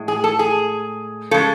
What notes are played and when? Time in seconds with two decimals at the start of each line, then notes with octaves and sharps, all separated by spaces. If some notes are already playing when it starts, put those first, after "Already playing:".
Already playing: A2 G#3
0.08 G#4
0.24 A4
0.39 G#4
1.31 C#3 G#3 A4